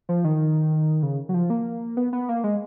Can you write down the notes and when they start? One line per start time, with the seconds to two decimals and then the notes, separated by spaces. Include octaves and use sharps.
0.09 F3
0.24 D#3
1.03 C#3
1.29 F#3
1.34 F3
1.50 A#3
1.97 B3
2.13 B3
2.29 A#3
2.44 G#3